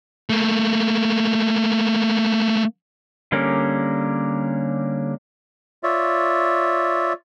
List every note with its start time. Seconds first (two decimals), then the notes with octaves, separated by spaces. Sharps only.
0.30 A3 A#3
3.32 D3 G3 A#3 C#4 A#4
5.83 F4 C#5 D5 E5